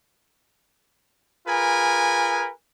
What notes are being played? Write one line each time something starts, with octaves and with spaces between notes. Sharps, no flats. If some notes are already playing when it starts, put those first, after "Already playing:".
F4 G#4 A#4 B4 G#5